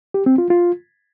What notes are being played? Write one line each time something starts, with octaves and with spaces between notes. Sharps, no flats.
G4
C4
F4
F4